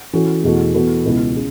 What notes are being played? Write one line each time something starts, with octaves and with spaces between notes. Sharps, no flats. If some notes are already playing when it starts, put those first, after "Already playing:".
E3 C#4 F#4 A4
E2 B2 A3 F#4 A4
E3 B3 F#4 A4
C#2 B2 B3 E4
C#3